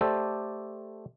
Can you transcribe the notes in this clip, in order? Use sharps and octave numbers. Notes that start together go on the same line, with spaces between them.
A3 G4 A4 C5 D5 A5